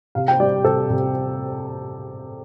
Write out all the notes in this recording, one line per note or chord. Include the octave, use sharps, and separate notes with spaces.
C3 F5
G5
G3 D5
C3 A4
C3